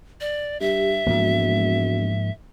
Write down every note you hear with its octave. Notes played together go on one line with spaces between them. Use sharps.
D5
G2 G4 E5
E1 G#2 F3 A#3 F#4